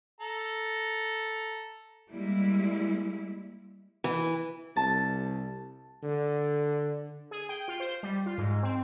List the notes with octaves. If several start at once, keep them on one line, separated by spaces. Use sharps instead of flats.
A4 A#5
G3 G#3 A#3 E4
E3
C2 A5
D3
G#4
G5
F4
C5
G3
F4
G#2
C4